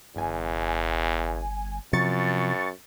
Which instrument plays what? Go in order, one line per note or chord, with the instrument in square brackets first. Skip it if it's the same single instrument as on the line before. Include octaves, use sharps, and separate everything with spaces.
[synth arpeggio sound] G1 G#5 [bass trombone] E2
[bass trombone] F#2 [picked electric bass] C3 F3 [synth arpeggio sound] C#6 A6 C#7